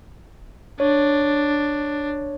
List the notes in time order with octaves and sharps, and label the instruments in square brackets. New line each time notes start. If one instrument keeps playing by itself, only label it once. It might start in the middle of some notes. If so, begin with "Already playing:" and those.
[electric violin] D4 [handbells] C#5